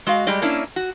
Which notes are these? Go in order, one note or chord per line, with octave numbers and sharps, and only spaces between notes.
G#3 F#4 D#5 F5
G3 G#3 G4 D5 D#5
A#3 C#4 D4 E4
F#4